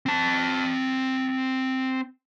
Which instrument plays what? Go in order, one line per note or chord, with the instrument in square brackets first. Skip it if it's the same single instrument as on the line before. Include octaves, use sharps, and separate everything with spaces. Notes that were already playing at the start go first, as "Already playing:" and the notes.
[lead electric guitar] C4 A5